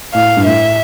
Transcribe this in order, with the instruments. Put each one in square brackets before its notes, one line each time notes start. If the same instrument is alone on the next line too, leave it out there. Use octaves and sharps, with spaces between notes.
[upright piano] A2 [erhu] F5
[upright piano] G2
[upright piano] A2 [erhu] E5